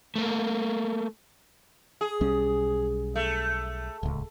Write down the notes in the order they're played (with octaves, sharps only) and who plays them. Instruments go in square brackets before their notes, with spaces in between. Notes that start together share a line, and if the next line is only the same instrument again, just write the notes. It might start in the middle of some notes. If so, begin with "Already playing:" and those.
[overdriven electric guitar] A3 A#3
[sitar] G#4
[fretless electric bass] B1 G3 C#4
[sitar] A3
[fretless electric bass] D1 C#2